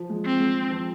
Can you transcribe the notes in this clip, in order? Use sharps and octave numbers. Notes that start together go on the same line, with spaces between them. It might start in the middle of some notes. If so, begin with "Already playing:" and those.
Already playing: F3
G#3
C4
G#3
F3